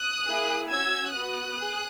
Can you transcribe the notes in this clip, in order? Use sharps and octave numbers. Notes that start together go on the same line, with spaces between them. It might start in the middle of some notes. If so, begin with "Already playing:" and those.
Already playing: D#6 F#6
A#3 E4 G#4
C#4 F#4 E6 G#6
B3 F#4 D#6 F#6
G#4